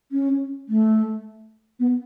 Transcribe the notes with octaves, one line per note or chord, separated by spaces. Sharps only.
C#4
A3
B3